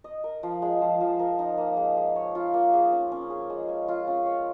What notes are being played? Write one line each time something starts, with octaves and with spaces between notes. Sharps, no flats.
D#5
A#4
F3
G#3
F3
F3
A#4
D#4
A#3
G#3
G#3
C#5
F4
A#3
G#4
C#4
C#4
G#4
G#3
G#3
F4
C#4
C#5